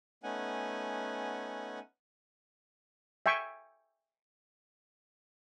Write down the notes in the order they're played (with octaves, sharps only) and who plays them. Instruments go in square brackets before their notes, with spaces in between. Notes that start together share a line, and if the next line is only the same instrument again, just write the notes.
[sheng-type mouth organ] A3 B3 C#4 D#4 F#5 G#5
[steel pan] E5 G5 G#5 C#6